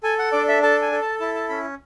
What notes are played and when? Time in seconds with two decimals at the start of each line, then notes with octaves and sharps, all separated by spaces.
0.03 A4 G#5
0.19 F#5
0.32 D4 D5
0.48 E5
0.63 A4 A5
0.82 G#5
0.92 A4
1.02 A5
1.20 E4 A5
1.35 A5
1.49 C#4 B5